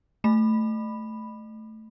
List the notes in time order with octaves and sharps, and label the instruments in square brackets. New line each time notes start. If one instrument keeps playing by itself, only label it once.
[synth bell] A3 B5